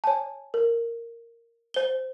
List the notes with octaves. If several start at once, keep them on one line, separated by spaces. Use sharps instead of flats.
C#5 G#5 A5
A#4
C5 G7